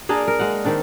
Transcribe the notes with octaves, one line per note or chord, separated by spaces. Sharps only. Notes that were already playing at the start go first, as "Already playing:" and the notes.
A#3 D4 G#4 A#4
A#4
G#3 F5 F#5
D#3 C4 D4